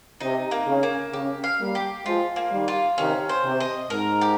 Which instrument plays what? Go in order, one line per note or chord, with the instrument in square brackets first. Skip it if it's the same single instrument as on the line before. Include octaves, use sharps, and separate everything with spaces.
[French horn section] C3 [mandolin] D#4
[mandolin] A#3
[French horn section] C#3
[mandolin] A#3
[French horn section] C#3 [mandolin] G4
[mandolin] F5
[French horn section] G3 A#3
[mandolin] G4
[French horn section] F3 G#3 [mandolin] F4
[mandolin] A#3
[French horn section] D#3 G3
[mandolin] F4
[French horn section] C3 D#3 [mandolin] C#4
[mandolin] C5
[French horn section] C3
[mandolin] D#5
[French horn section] G#2 [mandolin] A#4
[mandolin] G4